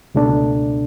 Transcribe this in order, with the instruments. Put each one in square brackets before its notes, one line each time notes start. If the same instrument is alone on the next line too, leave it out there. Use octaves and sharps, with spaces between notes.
[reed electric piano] C#2 B2 A3 D4